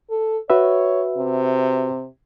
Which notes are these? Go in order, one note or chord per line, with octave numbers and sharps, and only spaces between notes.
A4
F#4 B4 C#5 E5
C3